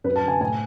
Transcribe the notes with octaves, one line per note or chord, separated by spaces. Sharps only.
F#2 B4
A5
D3
G#5
A2 G#5